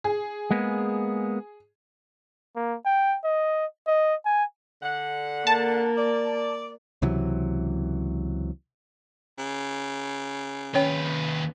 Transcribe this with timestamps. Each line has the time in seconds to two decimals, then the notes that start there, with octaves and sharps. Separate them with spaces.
0.04 G#4
0.51 G#3 A#3 B3
2.56 A#3
2.86 G5
3.24 D#5
3.87 D#5
4.25 G#5
4.83 D3 F#5
5.47 A#3 A5
5.97 D5
7.02 C#2 C3 E3 F#3
9.39 C#3
10.74 D#2 C#4 B4 C#5 G5